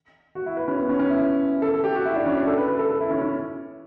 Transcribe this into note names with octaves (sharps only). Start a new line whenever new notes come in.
F#4
E4
B4
C#4
B3
C#4
C#4
E4
A4
A4
G4
F#4
E4
D4
C#4
D4
A4
B4
B4
A4
A4
E4
C#4
C#4